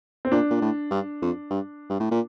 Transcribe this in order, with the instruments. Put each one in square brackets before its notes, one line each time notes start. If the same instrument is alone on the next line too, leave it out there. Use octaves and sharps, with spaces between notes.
[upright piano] C4
[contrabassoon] A#2 [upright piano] D4
[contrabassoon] A#2
A2
G2
F2
G2
G2
A2
A#2